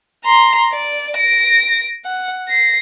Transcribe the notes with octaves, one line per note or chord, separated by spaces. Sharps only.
A#5 C6
D5
A#6 D7
F#5
A#6 C7